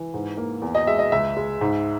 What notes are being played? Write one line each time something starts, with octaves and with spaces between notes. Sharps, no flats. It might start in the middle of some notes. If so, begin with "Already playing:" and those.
Already playing: E3
G#2
A#3
E2
D#5
G#3 E5
D#5
C#2 E5
G#3
G#2